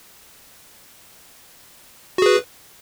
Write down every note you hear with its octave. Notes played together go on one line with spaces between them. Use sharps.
F#4 G#4 B4